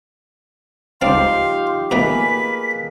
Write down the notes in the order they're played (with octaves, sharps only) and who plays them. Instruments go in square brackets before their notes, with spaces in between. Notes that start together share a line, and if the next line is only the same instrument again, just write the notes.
[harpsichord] C#2 C4 A5 [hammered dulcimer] F3 D#4 G4 [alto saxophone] F5 [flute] C6
[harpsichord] B2 D#3 A3 [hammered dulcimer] A#3 G#4 A#4 [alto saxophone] B4 [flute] B6